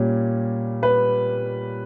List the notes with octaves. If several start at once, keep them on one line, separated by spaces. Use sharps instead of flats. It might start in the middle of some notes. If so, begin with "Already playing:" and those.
Already playing: A#2 G3 C#4
B4